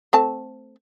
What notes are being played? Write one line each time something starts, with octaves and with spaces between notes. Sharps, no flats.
A3 C4 A5